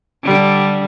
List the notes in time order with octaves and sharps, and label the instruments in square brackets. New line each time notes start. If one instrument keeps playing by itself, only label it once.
[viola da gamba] D3 G3